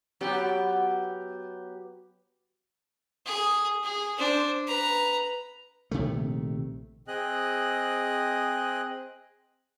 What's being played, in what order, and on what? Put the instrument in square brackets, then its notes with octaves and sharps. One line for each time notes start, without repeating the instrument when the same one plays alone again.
[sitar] F#3 B3 G4
[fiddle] G#4
G#4
D4 C5
B4 A#5
[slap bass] A#1 C3 D#3 A3
[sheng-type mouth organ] C4 G#4 D#5 F#6